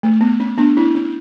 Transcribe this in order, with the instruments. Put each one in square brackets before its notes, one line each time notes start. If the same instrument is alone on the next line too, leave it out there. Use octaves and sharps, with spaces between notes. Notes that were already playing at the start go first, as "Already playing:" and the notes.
[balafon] A3
B3
C#4
B3 D4
C#4 E4
C#4